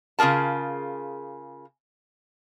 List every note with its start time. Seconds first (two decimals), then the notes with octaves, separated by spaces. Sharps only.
0.19 C#3 F4 G#4 A#4 A5